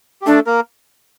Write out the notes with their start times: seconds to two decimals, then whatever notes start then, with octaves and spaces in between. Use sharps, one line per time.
0.22 G4
0.26 A3 D4 A4
0.46 A#3 A#4